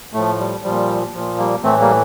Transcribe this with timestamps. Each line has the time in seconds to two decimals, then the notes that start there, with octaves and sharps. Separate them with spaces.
0.13 A2 F3 A3
0.39 G3
0.63 A#2 F3 G3
1.14 A#2 F3
1.38 G3 A#3
1.63 A2 E3 A3 C4
1.80 G3 A#3